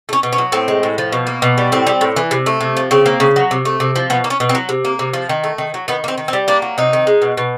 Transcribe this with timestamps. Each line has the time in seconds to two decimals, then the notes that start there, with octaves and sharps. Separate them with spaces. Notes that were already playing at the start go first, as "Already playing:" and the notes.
0.09 A3
0.13 C#4
0.23 B2
0.33 C#4
0.38 F#3
0.52 A2 C4
0.68 G#3
0.83 A2
0.98 F3
1.12 B2
1.27 A#3
1.42 B2
1.58 G3
1.72 A2 C4
1.87 G3
2.01 A2
2.16 E3
2.31 C3
2.46 A3
2.61 C3
2.77 F3
2.91 C#3 C4
3.06 A#3
3.20 C#3
3.36 F#3
3.51 C3
3.65 A3
3.80 C3
3.96 F3
4.10 B2 B3
4.24 A#3
4.30 C#4
4.40 B2
4.49 C4
4.55 F#3
4.69 C3
4.85 A#3
4.99 C3
5.13 F3
5.29 D#3
5.44 A3
5.58 D#3
5.74 F#3
5.88 D#3 B3
6.04 A#3
6.08 C4
6.18 D#3
6.28 C4
6.33 G3
6.48 A#3 D4
6.62 F#3
6.78 C3 D#4
6.93 D#3
7.07 G#3
7.22 B2
7.37 B2